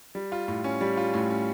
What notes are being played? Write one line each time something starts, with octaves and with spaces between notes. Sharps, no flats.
G3
F4
A2
C#4
G3
F4
A2
C#4